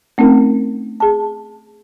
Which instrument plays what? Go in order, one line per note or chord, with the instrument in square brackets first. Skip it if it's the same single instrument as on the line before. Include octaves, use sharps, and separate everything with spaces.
[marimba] A3 C4 C#4 D#4 A#4
G#4 A5